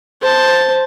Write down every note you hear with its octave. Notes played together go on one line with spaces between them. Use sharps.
C5 A5